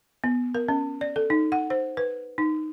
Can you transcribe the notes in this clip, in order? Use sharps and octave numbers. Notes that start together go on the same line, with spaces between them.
B3
A#4
C#4
D5
A4
D#4
F#5
C5
B4
D#4